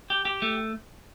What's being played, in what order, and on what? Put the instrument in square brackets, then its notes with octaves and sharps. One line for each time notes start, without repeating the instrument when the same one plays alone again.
[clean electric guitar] G4
G4
A3